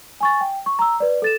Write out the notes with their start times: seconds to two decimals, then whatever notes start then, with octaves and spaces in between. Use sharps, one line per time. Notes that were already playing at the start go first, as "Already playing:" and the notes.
0.21 G#5 C#6 A6
0.41 G5
0.66 C#6
0.79 A#5 E6
1.00 B4 D5
1.22 A4 A6 E7